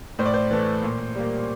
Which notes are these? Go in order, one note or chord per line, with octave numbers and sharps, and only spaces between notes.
A2 C5
D5
C5
E3 A3
A#2
G3 A#3